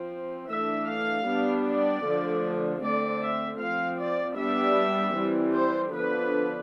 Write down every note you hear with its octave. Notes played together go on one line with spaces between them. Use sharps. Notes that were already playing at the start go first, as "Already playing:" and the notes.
Already playing: F3 C4
E3 A3 D4 E5
F5
G3 B3 D4
D5
D3 F3 A3
D3 A3 C4 D5
E5
F3 C4 F5
D5
G3 B3 D4 E5
E3 G3 C4
C5
D3 F3 B3 D4 B4